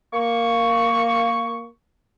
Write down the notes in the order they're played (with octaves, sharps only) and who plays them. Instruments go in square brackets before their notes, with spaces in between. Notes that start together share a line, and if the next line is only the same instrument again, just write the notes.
[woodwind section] A#3 C#6